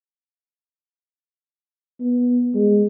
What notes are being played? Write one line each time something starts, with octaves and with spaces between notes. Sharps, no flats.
B3
G#3